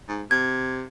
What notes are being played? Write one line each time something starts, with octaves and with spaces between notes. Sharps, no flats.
G#2
C3 G#6